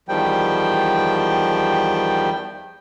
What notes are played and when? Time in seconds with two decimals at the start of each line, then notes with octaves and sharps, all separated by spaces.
0.09 E2 D#3 F3 G3 G5